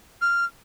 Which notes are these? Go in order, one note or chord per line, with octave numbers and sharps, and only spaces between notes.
F6